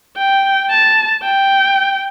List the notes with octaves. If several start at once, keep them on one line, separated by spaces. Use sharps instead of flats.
G5
A5
G5